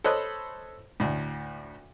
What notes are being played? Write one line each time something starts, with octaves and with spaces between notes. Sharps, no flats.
A4 C5 C#5 D#5 B5 F#6
D2 A2